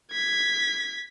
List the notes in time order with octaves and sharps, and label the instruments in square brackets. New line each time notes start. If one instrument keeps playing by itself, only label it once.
[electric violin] G#6 B6